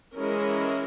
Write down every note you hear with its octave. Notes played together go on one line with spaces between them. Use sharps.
E3 G#3 C#4 E4 A#4